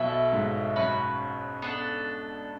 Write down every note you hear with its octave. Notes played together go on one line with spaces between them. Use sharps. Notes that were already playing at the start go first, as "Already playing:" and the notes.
Already playing: B1 B2 E4 A4 E5
G#2
F#2 C#4 F#4 B4
B3 D4 A4